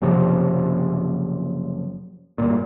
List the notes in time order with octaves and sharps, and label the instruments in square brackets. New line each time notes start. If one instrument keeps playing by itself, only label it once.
[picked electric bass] F#1 F#2 C3 F3
G1 D2 A#2